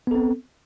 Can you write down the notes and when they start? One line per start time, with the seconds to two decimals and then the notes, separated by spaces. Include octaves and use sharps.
0.07 B3
0.11 A4
0.15 C4